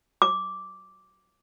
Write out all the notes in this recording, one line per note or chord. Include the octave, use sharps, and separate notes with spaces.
D6